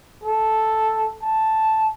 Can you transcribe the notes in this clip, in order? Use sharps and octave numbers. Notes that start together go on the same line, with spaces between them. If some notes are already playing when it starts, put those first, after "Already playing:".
A4
A5